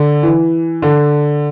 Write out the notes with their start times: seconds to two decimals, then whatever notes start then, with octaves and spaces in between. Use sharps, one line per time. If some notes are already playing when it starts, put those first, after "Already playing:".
Already playing: D3
0.23 E3
0.82 D3